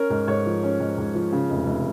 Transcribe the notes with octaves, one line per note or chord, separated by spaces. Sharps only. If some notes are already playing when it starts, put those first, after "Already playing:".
Already playing: C#4 A#4
G#2
G#2 C#5
F3
C#4
G#2
G#2
F3
C#3
F1
F1